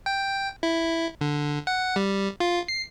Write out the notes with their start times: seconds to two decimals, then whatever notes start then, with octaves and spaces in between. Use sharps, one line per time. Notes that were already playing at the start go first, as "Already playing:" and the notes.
0.06 G5
0.63 E4
1.21 D3
1.67 F#5
1.96 G3
2.40 F4
2.68 C7